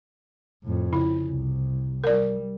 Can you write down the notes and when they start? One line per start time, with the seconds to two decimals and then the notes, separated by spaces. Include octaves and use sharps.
0.64 F2 A2
0.93 C#3 E4
1.29 C2
2.04 G3 A#4 D5